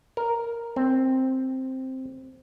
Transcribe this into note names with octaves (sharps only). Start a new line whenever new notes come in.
A#4
C4